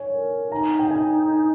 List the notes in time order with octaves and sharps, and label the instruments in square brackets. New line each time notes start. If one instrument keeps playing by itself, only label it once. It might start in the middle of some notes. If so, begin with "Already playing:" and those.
Already playing: [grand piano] C#5 G#5
[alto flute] A#4
[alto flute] D#4 [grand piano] A#5
[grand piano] G5
G#5